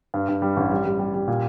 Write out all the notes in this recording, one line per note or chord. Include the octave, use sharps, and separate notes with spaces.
G2
G2
G3
A1
G3
G3
G3
G3
A#2